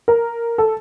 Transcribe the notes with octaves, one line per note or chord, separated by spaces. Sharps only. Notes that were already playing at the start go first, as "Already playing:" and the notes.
A#4
A4